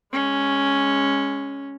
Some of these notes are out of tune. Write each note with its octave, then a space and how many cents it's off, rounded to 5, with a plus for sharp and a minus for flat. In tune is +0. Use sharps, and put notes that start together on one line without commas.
G#3 -10 C#4 +0